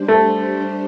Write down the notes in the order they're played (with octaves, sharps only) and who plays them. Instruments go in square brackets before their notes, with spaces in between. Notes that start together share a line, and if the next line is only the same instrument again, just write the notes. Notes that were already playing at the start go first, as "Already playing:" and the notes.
Already playing: [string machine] G3 D4 G4 C5
[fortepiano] A3